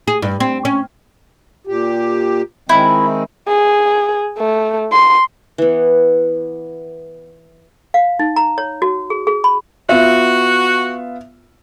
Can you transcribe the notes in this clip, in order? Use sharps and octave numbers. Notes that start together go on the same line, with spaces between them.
G#4
G2
C4
C#4
A#2 G4
D#3 G#3 C4 E4
G#4
A3
C6
E3 B3
F5
D#4
A#5
C#5
F#4
G#4
G#4
B5
B3 F4 F#4 E5